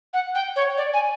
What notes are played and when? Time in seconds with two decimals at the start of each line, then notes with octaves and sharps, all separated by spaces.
0.13 F#5
0.35 G5
0.56 C#5
0.77 D5
0.94 G#5